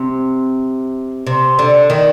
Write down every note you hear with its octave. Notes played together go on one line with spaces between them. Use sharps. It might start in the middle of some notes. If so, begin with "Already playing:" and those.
Already playing: C3
C3
D3
D#3